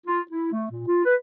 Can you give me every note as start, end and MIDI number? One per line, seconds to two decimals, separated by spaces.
0.06 0.21 65
0.31 0.50 64
0.52 0.67 57
0.71 0.83 46
0.87 1.04 65
1.05 1.16 71